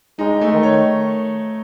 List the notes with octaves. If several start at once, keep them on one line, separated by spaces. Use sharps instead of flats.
G#3 D#4
A3
D#3
C#5